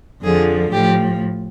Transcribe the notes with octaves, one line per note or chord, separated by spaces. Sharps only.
F2 D3 F3 G#4
A2 F3 G4